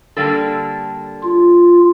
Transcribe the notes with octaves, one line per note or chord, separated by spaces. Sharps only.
D3 G3 A#3 D4 A4
F4